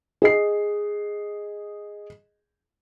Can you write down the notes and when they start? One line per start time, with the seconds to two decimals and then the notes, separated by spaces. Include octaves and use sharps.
0.22 G#4 D#5 C7